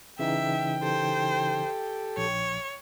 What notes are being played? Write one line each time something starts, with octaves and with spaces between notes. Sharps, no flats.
C#3 E3 D#4 E5 G5
G4 A4 C5
A#1 C#5